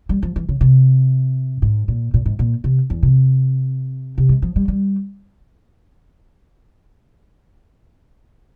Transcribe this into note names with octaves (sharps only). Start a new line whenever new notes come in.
G3
F3
E3
C#3
C3
G#2
A#2
A#2
G#2
A#2
C3
E2
C3
C3
G#3
F3
G3
G3